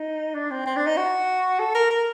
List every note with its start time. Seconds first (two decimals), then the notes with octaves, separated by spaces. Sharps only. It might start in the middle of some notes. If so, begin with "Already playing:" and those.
Already playing: D#4
0.35 D4
0.51 C4
0.66 C4
0.76 D4
0.87 D#4
0.97 F#4
1.59 A4
1.75 A#4
1.90 A#4